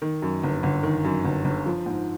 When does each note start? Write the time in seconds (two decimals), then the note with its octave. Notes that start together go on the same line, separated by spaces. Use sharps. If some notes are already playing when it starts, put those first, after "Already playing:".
0.02 D#3
0.22 F#2
0.43 G1
0.63 G1
0.83 D#3
1.05 F#2
1.25 G1
1.45 G1
1.66 F3
1.86 G#2